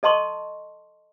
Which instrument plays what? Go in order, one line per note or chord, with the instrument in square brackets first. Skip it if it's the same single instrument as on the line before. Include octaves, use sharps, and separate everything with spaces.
[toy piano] A4 D#5 A5 C6 C#6